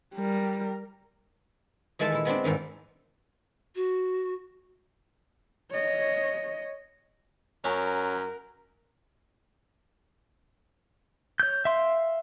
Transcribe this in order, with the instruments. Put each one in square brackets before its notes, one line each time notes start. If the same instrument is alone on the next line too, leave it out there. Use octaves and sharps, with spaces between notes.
[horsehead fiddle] G3 A#4
[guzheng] D#3 E3 G#3 A4 E5 A5
A#2 E4
G#3 B3 C4 D4
E2 G#2 D#3 E3
[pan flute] F#4
[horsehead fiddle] C#5 D#5
[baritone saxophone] F#2 [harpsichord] C#4 [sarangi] A#4
[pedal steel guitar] C#5 G6
E5 F5 C6